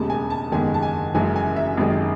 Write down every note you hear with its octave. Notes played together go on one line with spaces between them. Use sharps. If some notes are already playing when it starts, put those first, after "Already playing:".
Already playing: E1 D#2 C#3 G#3 A5
G#5
A5
F#1 E2 D#3 G#3 G#5
A5
G#5
F#1 F#2 E3 G#3 G#5
G#5
E5
G#1 F#2 D#3 G#3